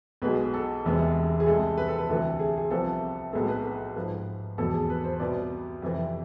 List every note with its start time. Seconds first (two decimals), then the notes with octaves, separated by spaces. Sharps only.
0.22 B1 B2 G#3 B4
0.54 A4
0.85 E1 E2 C3 G#3 B3
1.40 G#4
1.46 C2 C3 G#3 A4
1.78 B4
1.88 A4
1.98 B4
2.08 D2 C3 E3 A4
2.39 G#4
2.58 G#4
2.71 C2 C3 F3 B3 A4
3.33 B1 A2 G#3 B3 A4
3.48 B4
3.64 B4
3.96 G#2 F3 B3 B4
4.58 F1 E2 B2 A4
4.73 G#4
4.90 B4
5.04 C5
5.20 C2 B2 B3 D5
5.82 F2 C3 E3